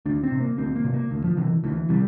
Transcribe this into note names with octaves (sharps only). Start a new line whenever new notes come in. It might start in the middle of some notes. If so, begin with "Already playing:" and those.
D2 D4
C4
C3
A#3
D2 C4
A#3
C3
A#3
D2
F3
C3 E3
D2 E3
C3 G3